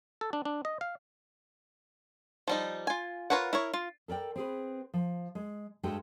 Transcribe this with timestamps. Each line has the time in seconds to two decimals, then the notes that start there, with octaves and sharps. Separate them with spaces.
0.21 A4
0.33 D4
0.45 D4
0.65 D#5
0.81 F5
2.48 F3 G3 D#4
2.87 F4 G#5
3.30 F4 A#4 B4 C#5 F#5
3.53 E4 A#4 C#5
3.74 F4
4.08 A4 A#4 D5 G5
4.36 C4 G#4 B4
4.94 F3
5.35 G#3
5.83 G2 G#3 F#4 A4 G5